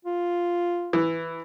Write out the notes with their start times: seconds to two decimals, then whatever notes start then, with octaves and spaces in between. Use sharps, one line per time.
0.05 F4
0.93 E3